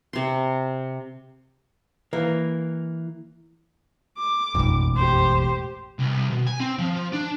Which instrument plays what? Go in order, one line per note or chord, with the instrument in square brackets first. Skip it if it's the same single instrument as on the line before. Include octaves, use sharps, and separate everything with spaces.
[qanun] C3 C6
[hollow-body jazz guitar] E3 A#3
[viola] D6
[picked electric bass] E1 A1 [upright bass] F2 D#4
[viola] G4 C5
[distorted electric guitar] C2
B2
G#5
C4
F3
D4